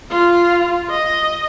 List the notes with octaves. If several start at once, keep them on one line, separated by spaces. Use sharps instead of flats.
F4
D#5